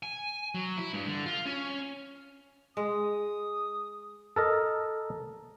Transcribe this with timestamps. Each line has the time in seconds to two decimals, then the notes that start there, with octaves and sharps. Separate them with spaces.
0.03 G#5
0.55 F#3
0.78 E4
0.93 G2
1.07 D3
1.26 F4
1.46 C#4
2.77 G#3 D#6
4.36 A4 A#4 D#5